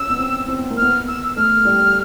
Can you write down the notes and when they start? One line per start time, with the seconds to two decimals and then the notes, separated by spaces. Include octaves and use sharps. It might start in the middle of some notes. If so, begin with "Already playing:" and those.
Already playing: C#4 E6
0.10 B3
0.18 C4
0.48 C4
0.59 B3
0.70 A#3
0.77 F6
0.82 B3
1.07 E6
1.37 A3 F6
1.65 G3